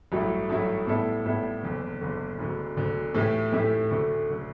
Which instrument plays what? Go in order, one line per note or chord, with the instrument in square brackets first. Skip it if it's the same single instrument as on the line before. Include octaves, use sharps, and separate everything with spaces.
[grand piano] A1 G2 F#3 A3 E4
A1 G2 F#3 A3 E4
A2 G3 B3 E4 A4
A2 G3 B3 E4 A4
F#1 E2 D3
F#1 E2 D3
E1 D2 D3
E1 D2 D3
A2 E3 A3 E4 G4
A2 E3 A3 E4 G4
D2 D3 A3
D3 A3